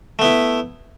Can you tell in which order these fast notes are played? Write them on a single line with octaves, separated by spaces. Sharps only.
A3 B3 E4